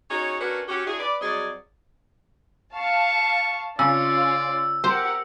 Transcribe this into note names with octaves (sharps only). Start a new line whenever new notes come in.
C#4 D#4 F#4 G#4 C#5
C#4 D4 F#4 A#4 B4
C#4 F#4 G4
D4 E4 F#4 G#4
B4 D5
F#3 G3 C4 G#4 D5 D#5
F5 A5 C#6
C#3 C#4 F4 D5 E6
G4 A#4 C5 F#5